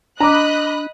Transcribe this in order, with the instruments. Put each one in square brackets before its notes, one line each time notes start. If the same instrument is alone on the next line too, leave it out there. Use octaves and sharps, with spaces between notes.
[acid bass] D4 [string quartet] D#5 [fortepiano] A#5 D6 [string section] B5 D#6 F#6